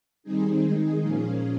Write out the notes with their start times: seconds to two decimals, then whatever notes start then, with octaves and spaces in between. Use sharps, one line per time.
0.23 D#3 G3 C4 D#4 G#4
0.62 D#3 G#3 D#4
1.01 A#2 F3 A#3 C#4